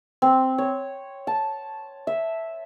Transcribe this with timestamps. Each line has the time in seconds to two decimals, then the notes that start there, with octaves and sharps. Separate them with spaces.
0.22 C4
0.58 C#5
1.27 A5
2.07 E5